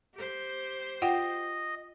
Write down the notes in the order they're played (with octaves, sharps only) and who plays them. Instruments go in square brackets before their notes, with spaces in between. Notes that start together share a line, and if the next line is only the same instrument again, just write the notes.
[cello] G4 C5
[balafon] F4 F#5 G5 [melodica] D#5